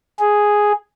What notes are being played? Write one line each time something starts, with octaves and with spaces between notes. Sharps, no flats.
G#4